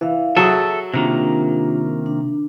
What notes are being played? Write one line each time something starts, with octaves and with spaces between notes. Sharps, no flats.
E3 E5 F5
F#3 G#4 A4 E5 D#6
C3 D#3 A#3 D4 F4 G4
D4